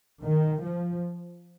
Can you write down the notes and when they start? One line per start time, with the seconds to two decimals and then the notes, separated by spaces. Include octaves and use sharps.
0.22 D#3
0.60 F3